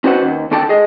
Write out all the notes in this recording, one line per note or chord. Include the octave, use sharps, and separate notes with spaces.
C#4 F#4 B4 C5 F#5
D#2
D#2 D3 A4 G5 A5
G#4 D#5